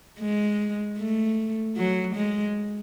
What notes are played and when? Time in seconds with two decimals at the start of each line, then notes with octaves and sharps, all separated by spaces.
0.20 G#3
0.98 A3
1.77 F#3
2.16 G#3